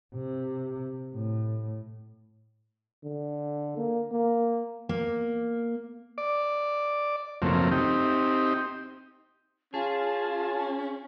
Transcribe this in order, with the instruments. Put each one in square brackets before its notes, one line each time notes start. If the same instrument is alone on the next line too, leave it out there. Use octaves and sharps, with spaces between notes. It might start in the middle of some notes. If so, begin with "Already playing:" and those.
[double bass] C3
A2
[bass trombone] D3
A#3
A#3
[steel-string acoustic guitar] A#3
[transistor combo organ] D5
F#2 C#3 F3 A3 A#3 C4
C4 D#4 G4
[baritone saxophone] C#4 [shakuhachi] F4 [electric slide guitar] G#4 [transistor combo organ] A5